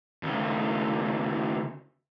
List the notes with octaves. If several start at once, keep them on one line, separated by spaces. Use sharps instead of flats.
D#2 C#3